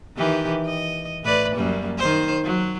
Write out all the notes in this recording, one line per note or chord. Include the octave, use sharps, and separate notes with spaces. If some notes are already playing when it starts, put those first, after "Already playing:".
D#3 E3 G4
D#5
A2 B4 D5
F#2 G3 A#3
D#3 C5
F#3